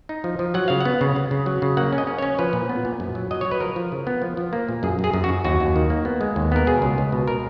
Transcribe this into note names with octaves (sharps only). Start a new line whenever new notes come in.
D#4
F3
F3
F#3 F#5
C#3 F5
B3 F#5
C#3
C#3
C#3
F#3
C#3
A#3 F#5
C#4
D#5
C#4
C#5
C#4
F3 B4
A#2
B3
A#2
F#2
F#3
F#3 D#5
F#3 C#5
B4
F3 A#4
F3
C#3
B3
F3
F3
A#3
A#2
F#2 G#4
F#2
G#4
F#2
F#4
F#2
D#2 F#4
D#2
D#3
A#3
B3
G#3
D#2
B3 A#4
B2 G#4
C#2
C#2
B2
A#4